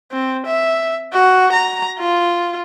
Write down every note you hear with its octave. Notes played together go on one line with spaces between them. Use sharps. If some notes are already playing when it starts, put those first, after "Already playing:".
C4
E5
F#4
A#5
F4